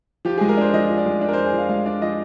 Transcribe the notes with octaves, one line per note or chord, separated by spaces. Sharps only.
F3 G4
G#3 G#4
A#4
D4 C5
F3 D#5
F3
D5
G#3
D4 D5
A#4
F3 C5
G#4
F3
F5
G#3 F5
D4 D5
F3 D#5